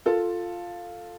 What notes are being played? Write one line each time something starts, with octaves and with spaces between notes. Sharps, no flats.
F4 A4